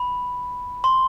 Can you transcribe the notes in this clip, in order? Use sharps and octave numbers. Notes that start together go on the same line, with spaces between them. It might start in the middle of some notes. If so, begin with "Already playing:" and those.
Already playing: B5
C6